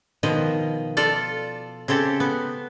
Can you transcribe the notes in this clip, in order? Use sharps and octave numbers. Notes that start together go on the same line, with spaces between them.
B2 D#3 F3 D#5
F4 A4 D5
C#3 C4 G4 A4
B3